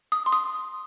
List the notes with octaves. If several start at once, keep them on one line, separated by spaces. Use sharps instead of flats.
D#6
C6
D#6